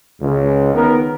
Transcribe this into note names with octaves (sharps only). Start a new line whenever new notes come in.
C#2
D#3 B3 A#4